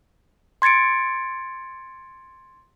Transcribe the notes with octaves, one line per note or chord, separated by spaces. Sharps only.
C6 G#6 A6 C#7 D7